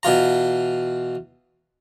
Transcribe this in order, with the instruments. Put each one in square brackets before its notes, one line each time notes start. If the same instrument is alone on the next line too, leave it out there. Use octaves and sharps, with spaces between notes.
[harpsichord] B2 E3 F4 A#5